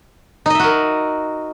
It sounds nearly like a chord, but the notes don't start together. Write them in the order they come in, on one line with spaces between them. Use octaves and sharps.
D#4 D#5 E5 F#4 A#4